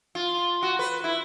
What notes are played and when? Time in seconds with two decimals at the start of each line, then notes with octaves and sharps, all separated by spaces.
0.15 F4
0.63 F#4
0.79 B4
1.04 E4